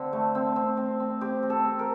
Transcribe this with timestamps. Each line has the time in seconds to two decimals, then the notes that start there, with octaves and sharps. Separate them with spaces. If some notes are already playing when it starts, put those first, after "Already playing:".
Already playing: D3 C4
0.13 A3
0.35 C4
0.56 C4
0.77 C4
1.00 C4
1.21 C4 G4
1.43 C4
1.50 A4
1.64 C4
1.79 A#4